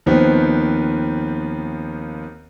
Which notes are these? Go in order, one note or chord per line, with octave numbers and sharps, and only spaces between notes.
D#2 D#3 F3 B3 C4